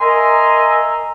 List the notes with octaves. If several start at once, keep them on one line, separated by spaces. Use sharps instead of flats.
A#4 D#5 E5 G#5 A#5 C6